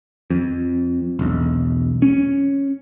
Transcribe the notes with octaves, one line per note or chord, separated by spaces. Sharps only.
F2
E1 B1
C#4